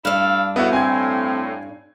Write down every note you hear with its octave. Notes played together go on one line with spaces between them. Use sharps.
G2 D4 E4 A4 F5
A2 B3 E4 F#4
C4 G#5 G#6